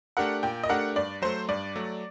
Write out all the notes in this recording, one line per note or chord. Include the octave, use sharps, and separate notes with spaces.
A3 D4 G4 A#4 F#5
A#2 G5
D#5
A3 D4 G4 A#4 F#5
G2 D5
F#3 A3 C5
G2 D5
F#3 A3